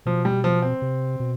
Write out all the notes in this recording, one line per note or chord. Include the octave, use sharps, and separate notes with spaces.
B2 F3
G3
F3
C4
C3
B2